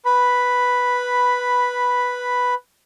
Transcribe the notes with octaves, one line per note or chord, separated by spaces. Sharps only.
B4 B5